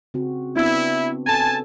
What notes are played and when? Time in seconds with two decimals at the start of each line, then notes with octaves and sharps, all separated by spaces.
0.14 C#3 C4 F#4
0.56 B3 C4 D4 E4
1.27 C#4 A4 G#5 A5